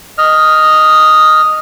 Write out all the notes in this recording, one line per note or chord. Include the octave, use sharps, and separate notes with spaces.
D#5 F6